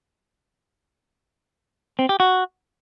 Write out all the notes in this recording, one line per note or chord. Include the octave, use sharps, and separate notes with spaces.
C4
G4
F#4